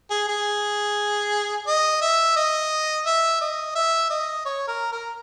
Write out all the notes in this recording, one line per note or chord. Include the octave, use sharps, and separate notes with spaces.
G#4
G#4
D#5
E5
D#5
E5
D#5
E5
D#5
C#5
A#4
A#4